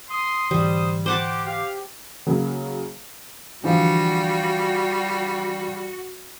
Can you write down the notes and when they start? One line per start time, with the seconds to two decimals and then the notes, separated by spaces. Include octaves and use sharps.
0.10 C6 D#6
0.51 G#2 D3 E3 G3 C5
1.06 G4 C5 F#5 A5 D6
1.46 G4 F5
2.26 C#3 F#3 A#3
3.64 D3 E3 F3 G3 F#4